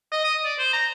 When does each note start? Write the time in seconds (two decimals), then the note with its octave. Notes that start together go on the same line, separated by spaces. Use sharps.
0.12 D#5
0.25 D#6
0.45 D5
0.59 C5
0.73 A#5